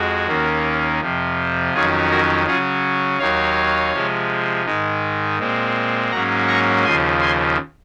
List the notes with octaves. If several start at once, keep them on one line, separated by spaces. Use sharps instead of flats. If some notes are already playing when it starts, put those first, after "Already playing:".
Already playing: F2 G#3 F#4
D#2 D#3 A#3 C#4
F2 C3 F3
F2 D#3 F#3 C#4 F4 G#4
F#4 A#4
C#3 F#3 C#4 F4 G#4
D#2 D#3 F#3 C#5 F5
C3 F3 G#3
G#2 D#3 G#3
A#2 G#3 C4
G#2 F#3 A#3 C#4 F#5 A#5
A#5 C#6
D#2 C#3 F3 G#5 C6
G#5 C6